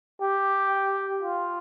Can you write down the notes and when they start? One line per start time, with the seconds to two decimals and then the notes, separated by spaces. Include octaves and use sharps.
0.21 G4
1.22 F4